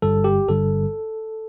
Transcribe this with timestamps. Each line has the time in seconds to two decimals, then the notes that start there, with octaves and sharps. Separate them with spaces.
0.02 G1 G2 D3 G3 A4
0.24 G4
0.48 G1 G2 D3 G3 A4